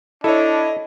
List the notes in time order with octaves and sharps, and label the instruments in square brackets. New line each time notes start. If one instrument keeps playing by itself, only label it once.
[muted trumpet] D4 [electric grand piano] E4 C#5 [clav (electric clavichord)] A4 [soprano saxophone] D#5